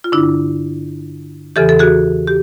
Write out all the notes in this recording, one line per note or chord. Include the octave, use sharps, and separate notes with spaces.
F4
G2 D3 D4 E4
E2 C#3 E3 G4 A4
A4
F#4 G#4
G4